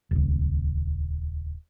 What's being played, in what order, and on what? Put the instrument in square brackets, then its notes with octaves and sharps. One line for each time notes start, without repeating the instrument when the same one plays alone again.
[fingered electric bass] D#1 C#2